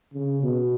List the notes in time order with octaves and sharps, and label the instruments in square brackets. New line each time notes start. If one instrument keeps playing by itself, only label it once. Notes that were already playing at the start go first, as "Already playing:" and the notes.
[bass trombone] C#3
B2